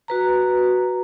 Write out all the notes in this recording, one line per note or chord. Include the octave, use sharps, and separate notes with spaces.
F#4 B4 A#5